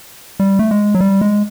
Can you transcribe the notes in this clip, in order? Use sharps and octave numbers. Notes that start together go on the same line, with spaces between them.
G3
A3
G#3
F#3
G3
G#3